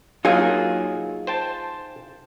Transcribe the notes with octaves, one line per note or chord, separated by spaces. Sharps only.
F#3 A#3 D#4 F4 G#4
C5 G5 A5